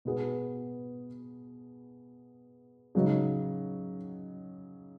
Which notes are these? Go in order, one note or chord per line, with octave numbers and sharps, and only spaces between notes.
B2 B3 G#4 B4
C#3 F#3 D#4